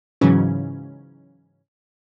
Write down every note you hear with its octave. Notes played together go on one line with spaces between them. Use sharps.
G#2 C#3 E3 F#3 C#4